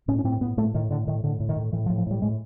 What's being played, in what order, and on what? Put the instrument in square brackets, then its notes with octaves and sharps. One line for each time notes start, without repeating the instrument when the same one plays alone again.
[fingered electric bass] A2 C#4
C#4
A2 C4
A2 B3
A2 A3
A2 D#3
A2 D3
A2 D#3
A2 D3
A2
D#3
A2
A2 E3
F3
A2
F3
A2 G3
A2 G#3